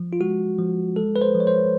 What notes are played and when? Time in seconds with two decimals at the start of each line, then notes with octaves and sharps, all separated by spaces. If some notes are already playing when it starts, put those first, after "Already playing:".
Already playing: F3
0.13 F4
0.21 G#3 F#4
0.58 F3
0.96 G#3 A4
1.16 B4
1.21 C5
1.35 F3
1.40 C#5
1.47 C5